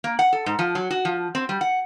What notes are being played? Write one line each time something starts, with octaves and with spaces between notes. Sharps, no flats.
A#3
F#5
A4
G#2
F3
F#3
F#4
F3
C4
G3
F#5